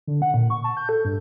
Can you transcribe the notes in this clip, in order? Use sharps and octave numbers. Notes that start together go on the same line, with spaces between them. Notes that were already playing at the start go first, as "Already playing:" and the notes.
D3
F#5
A#2
C#6
A5
G6
A4
G2